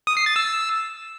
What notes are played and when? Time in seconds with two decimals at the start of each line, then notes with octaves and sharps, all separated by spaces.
0.07 D#6
0.17 C7
0.26 A6
0.36 E6